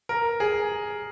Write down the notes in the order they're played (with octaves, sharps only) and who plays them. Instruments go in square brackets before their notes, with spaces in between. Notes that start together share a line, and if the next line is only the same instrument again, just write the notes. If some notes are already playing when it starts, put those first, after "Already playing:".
[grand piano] A#4
G#4